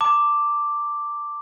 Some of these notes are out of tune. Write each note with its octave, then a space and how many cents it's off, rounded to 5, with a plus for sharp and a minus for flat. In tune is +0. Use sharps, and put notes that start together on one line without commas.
A5 +45 D6 +0